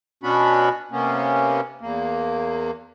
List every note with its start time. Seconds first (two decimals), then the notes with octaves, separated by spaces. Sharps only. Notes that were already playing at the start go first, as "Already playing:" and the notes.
0.23 B2 B3 C#4 D4 F#4 B5
0.92 C3 A#3 B3 C#4
1.81 E2 A#3